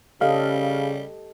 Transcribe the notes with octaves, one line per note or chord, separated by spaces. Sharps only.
C#3 G3 G4 A4 D#5 F5